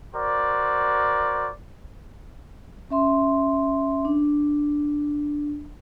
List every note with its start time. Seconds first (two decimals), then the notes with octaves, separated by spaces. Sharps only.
0.15 F#4 A#4 C5 D5
2.90 C#4 E5 C6
4.05 D4